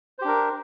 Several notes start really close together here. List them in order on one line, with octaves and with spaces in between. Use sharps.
C5 G4 D4 A#4